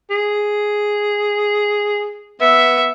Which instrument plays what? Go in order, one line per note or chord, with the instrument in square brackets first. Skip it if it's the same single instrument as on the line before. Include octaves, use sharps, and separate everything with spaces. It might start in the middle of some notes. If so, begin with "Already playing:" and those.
[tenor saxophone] G#4
[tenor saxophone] B3 [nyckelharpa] E5